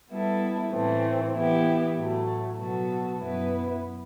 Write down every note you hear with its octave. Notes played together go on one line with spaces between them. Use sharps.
G3 B3 E4 A4
A2 E3 A3 C4
E3 B3 E4 G4
A2 F#3 A3
B2 F#3 B3 F#4 A4
F#2 F#3 B3 E4 B4